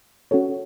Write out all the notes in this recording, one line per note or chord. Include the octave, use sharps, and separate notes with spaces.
C#4 F#4 A4 C#5